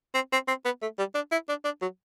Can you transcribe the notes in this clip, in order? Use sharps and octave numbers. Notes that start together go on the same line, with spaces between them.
C4
C4
C4
B3
A3
G3
D4
E4
D4
D4
F#3